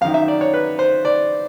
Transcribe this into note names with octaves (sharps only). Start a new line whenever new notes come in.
F#2 D#3 F5
E5
D5
C#5
B4
C5
D5